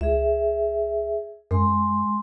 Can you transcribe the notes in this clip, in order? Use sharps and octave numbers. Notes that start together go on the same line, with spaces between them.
C#2 G#4 E5
F#2 G#3 C6